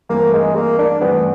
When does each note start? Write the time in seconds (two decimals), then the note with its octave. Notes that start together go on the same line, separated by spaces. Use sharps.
0.10 G2 E3 A3 A#3 C4
0.33 G#3
0.56 A#3
0.79 D4
1.01 G2 E3 A3 B3 C4